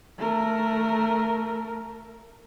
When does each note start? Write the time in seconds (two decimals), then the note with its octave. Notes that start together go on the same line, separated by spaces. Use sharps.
0.18 A3 A#4